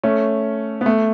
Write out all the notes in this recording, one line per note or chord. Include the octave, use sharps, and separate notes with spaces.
A3 C#4
B3
A3